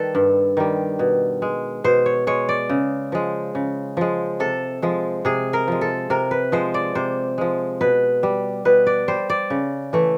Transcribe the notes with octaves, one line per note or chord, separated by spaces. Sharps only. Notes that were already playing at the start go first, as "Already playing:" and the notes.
Already playing: D#3 G3 A4 B4
G2
D#3 G3
B2
G#3
B2 C5
C#5
G#3 C#5
D5
C#3
F3 G#3
C#3
F3 G#3
C3 A4
F3 G#3
C3 G#4
A#4
F3 G#3
A4
C3 A#4
B4
F3 G#3 C5
D5
C3 C5
F3 G#3
B2 B4
G3
B2 B4
D5
G3 C5
D5
C#3
E3 A3